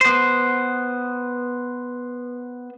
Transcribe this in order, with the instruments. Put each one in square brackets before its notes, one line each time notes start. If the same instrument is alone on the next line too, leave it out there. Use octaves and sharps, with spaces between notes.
[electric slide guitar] B3 C5